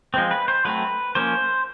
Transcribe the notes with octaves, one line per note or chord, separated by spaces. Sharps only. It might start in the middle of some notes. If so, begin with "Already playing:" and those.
F3 G#3 C4
B4
C5
F#3 A3 C4 B4
F3 A#3 C#4 C5